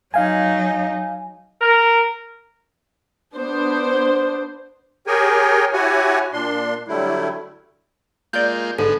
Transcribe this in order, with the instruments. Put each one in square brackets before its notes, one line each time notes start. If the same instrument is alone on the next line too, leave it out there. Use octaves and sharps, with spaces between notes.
[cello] F#3 D#4 [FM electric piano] F5 G#5
[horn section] A#4
[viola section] B3 D4 C5
[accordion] G4 G#4 A#4 C#5 G5 G#5
E4 F#4 G4 C#5 F#5 G#5
A#2 D4 C6
D3 F#3 G3 A3 E4
[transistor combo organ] G#3 A#3 F4 [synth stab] D5 G6
[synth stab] G#1 G#2 [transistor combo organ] D3 G#3 B3 [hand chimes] A4